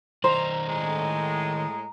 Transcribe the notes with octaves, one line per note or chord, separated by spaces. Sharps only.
D#3 C5 D5 D#5 A#5
A2 G#3